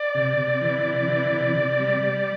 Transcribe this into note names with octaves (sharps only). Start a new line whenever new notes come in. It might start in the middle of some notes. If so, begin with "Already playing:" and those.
Already playing: D5
C3
C3
E3
C3
E3
C3
C3
G3
G3